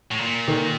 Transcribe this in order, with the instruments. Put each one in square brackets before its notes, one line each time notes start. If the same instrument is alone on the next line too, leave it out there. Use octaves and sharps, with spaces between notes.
[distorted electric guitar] A2
A#2
[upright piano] D#3